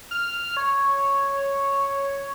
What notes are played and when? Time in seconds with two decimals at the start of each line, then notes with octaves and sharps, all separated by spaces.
0.11 F6
0.57 C#5